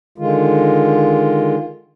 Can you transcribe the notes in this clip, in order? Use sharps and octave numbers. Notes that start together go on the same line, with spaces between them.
D3 D#3 G#3 F4